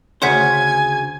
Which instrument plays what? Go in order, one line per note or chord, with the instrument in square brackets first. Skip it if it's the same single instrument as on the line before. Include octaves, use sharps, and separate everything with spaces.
[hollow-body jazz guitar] D2 C#3 C5 [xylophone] C#5 F#5 B6 [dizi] G#5 [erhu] G#6